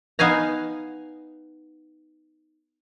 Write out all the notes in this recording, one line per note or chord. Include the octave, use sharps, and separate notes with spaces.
B3 D#4 F5 G#5 A#5